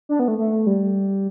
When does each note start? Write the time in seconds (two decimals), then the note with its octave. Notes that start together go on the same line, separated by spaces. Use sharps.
0.09 D4
0.19 B3
0.28 A3
0.38 A3
0.66 G3